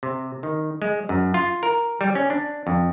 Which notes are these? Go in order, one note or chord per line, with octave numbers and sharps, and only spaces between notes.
C3
D#3
G#3
F#2
F4
A#4
G3
C#4
D4
F2